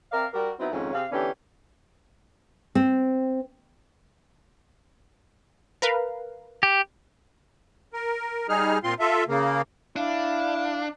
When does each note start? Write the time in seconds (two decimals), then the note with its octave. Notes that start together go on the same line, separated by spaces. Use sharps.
0.12 C4 A#4 D5 E5 F5
0.34 G3 F#4 G4 A#4
0.60 F#3 B3 C4 D#4 E4
0.72 F2 G#2 D#3 G#3 C#4
0.93 C3 C4 G#4 F5
1.12 D3 E3 B3 C#4 D4 G4
2.75 C4
5.82 A#4 B4 F5
6.63 G4
7.93 A#4
8.49 G3 D#4 G#4 F6
8.84 A#2 C4 F4 C6
9.00 F4 A4 E5
9.28 C#3 A#3
9.96 D4 E4 F5